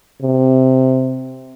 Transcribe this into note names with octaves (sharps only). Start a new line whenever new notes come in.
C3